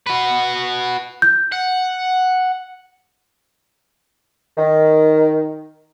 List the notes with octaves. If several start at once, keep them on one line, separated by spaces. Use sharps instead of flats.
F#4 B4
G6
F#5
D#3